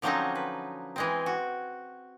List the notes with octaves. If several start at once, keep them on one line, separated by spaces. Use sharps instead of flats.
D3 F3 F#3 C4 C#4 D#4
B4
E3 G#3 C4
F#4